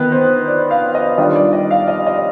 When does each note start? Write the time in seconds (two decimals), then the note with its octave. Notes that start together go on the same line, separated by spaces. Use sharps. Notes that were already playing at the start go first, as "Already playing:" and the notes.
Already playing: D#3 B3 D#4 B4
0.12 C5
0.48 D5
0.71 F5
0.95 D#5
1.18 D#3 G3 D4 F4 D#5
1.35 D5
1.53 D#5
1.71 F5
1.88 D#5
2.06 D#5